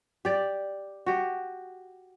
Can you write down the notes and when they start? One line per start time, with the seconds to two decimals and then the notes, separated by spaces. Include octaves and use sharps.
0.25 G4 D5
1.06 F#4 G4